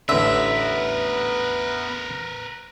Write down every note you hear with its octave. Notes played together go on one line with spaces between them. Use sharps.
A1 D3 B3 A#4 B4 E5